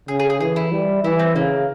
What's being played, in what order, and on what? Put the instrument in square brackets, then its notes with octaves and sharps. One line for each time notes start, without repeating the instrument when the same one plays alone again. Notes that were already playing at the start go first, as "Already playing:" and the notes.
[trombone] C#3 [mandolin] G#4
[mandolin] G#4
G#4
[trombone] E3 [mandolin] G#4
[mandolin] E4
[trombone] G3
[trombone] E3 [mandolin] E4
[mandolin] C4
[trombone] C#3 [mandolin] A#3